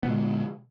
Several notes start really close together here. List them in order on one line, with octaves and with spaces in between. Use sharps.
B3 A#2 G#3 D3